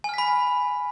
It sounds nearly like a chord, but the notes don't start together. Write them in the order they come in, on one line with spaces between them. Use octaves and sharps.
G#5 F6 B6 B5